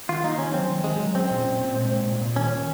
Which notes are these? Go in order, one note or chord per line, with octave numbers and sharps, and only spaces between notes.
D#3 F4
A#3 D#4
D#3 C#4
F#3 C4
D#3
D#3 G#3
F#3
C4 C#4
A#2
A#2
A#2
G#3
A#2
A#2
A#2
D#3 C#4
D#3